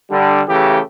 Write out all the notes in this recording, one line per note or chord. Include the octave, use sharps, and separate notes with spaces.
D3 G3
C#3 E3 A3 G4